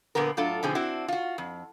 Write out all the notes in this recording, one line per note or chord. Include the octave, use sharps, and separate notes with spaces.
A#2 D3 F3 B3 A#4
A2 F#3 D4 F4 A4
B2 D3 F3 C4 D#4 G#4
C4 D4 E4 F#4
F4 F#4
F2